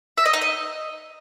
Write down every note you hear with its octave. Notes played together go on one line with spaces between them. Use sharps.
E5
D#5
D#4
D#5